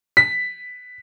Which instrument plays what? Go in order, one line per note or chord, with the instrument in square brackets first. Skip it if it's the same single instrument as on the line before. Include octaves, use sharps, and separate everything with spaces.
[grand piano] B6